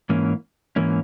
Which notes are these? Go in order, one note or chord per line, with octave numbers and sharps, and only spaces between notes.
G#2 E3 A#3 C#4
G#2 E3 A#3 C#4